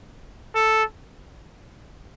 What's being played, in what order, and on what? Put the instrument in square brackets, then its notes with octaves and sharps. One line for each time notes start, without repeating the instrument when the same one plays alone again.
[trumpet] A4